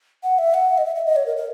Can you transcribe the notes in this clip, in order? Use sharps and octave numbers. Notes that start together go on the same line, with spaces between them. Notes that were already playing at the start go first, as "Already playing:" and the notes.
F#5
E5
F#5
D#5
E5
E5
D#5
C#5
A#4
A#4